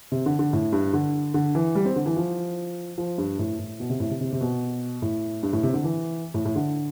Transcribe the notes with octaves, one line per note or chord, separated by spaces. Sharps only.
C3
D3
D3
A2
G2
D3
D3
E3
G3
C4
D3
E3
F3
F3
G2
A2
A2
B2
C3
A2
C3
C3
C3
B2
A2
G2
A2
C3
D3
E3
A2
A2
D3